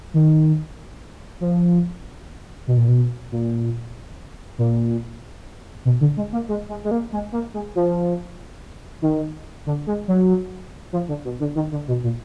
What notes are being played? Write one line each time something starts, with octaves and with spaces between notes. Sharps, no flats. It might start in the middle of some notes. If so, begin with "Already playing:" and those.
D#3
F3
B2
A#2
B2
A#2
A#2
B2
D3
G#3
A#3
G#3
G#3
G#3
A#3
G#3
A#3
G#3
F3
D#3
D3
G#3
F#3
F3
D3
B2
D3
D#3
D3
B2
A#2